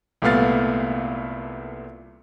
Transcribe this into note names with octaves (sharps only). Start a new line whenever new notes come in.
C2 A#2 A3 B3 F5 A6